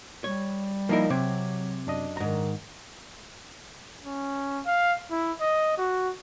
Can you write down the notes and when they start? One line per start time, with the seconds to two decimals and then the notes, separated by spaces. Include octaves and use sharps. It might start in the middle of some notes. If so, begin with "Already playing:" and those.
0.24 G3 C#5
0.89 F3 A#3 D#4 E4 A#4
1.10 C3 F#3 C4 D6 G#6
1.87 F#2 D4 D#5
2.17 G#2 D#3 A#5
4.04 C#4
4.66 F5
5.11 E4
5.40 D#5
5.78 F#4